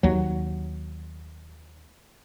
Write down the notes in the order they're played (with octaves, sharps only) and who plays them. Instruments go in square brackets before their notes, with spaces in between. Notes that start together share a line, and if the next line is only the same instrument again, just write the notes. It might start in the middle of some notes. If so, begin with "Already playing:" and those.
[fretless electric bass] D#2 F#3